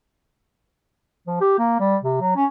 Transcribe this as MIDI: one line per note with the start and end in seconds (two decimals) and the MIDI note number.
1.27 1.36 53
1.41 1.57 67
1.59 1.80 58
1.80 1.97 55
2.03 2.16 48
2.21 2.33 54
2.36 2.45 61